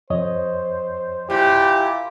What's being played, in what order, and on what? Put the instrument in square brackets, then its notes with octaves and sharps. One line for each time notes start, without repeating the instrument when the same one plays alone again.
[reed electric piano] F2 C#5 D#5 [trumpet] C5
[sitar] A#2 [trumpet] E4 [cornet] G4